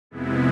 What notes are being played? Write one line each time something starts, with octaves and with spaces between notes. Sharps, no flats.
F2 C3 G#3 B3 E4